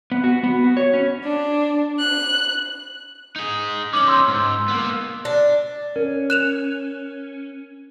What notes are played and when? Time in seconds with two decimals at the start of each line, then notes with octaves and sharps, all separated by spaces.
0.12 B3
0.24 F#4
0.44 B3
0.64 F#4
0.77 C#5
0.93 C#4
1.24 D4
1.99 F#6
3.36 D#4 G#4
3.93 C#4 D#4 D6 F#7
4.08 C6 E6 G6
4.28 G#2
4.68 A#3 B3
5.25 D4
5.96 C#4 A#4
6.30 F#6 E7 F7